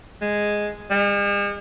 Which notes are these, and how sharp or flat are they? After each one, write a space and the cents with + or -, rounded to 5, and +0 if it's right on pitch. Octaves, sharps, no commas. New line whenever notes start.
G#3 +0
G#3 -45